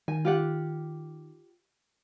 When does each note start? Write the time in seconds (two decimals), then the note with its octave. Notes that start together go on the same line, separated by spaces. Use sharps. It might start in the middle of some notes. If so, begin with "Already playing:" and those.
0.08 D#3 G#5
0.25 F4 G4 F#5